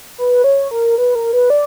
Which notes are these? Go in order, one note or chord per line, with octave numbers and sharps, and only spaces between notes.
B4
C#5
A#4
B4
A#4
B4
D5